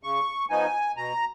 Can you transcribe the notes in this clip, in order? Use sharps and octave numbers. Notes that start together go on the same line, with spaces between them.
C#3 C#6
F3 B3 D#4 G#5
B2 A#5